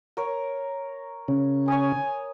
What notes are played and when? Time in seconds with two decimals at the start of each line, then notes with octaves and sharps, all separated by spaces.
0.17 A#4 C#5
1.28 C#3 C#4
1.68 C#5 G#5 D#6